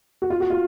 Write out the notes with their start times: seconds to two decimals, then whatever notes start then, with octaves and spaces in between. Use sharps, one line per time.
0.22 F#4
0.30 F4
0.40 F#4
0.50 F4